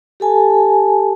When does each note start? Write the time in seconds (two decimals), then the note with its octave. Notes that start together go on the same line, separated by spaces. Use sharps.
0.20 G4 A4 G#5 A5